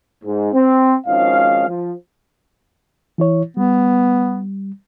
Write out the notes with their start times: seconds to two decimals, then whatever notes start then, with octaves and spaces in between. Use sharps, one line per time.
0.24 G#2
0.53 C4
1.07 G#1 G#2 F3 C#4 D#5 F5
1.68 F3
3.18 E3 E4 C#5
3.57 G3 B3